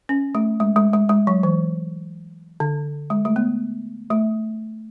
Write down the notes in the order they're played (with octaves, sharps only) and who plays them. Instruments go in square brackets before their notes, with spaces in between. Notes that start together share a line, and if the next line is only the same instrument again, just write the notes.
[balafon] C#4
A3
G#3
G#3
G#3
G#3
F#3
E3
D3
G#3
A3
B3
A3